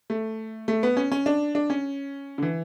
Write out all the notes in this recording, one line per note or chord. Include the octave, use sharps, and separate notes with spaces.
A3
A3
B3
C#4
C#4
D4
D4
C#4
D3
E3